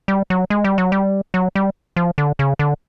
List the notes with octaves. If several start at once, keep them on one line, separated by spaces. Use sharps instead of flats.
G3
F#3
G#3
G3
F#3
G3
F#3
G3
F3
D3
C#3
D3